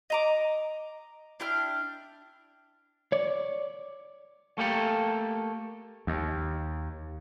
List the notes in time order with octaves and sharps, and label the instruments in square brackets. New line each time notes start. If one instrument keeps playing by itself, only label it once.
[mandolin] D#5 A#5 D6
D4 E4 G5 F6
[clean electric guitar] C#5 D5
A3 A#3 G4 A4
[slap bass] D#2